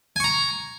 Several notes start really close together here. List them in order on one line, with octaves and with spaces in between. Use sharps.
G#5 C#6 A#5